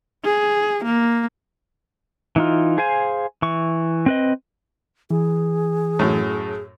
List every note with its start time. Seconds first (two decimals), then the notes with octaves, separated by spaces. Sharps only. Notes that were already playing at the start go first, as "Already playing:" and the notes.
0.24 G#4
0.84 A#3
2.36 E3 D#4 F4
2.78 G#4 C5 F5 G#5
3.42 E3 C#6
4.06 C4 B4 D#5
5.11 E3 G#4
5.99 F#2 A2